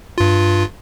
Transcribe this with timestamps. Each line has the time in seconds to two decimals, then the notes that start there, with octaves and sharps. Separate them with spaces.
0.18 G2 F4